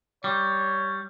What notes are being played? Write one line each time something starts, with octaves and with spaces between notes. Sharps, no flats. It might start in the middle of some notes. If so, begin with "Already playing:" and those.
G3 C#5